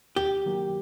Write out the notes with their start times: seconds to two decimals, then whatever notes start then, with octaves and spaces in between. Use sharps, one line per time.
0.16 D#2 G4
0.46 D#3 F#3 A#3